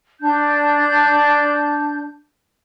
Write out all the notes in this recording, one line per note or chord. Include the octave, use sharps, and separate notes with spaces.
D4 G6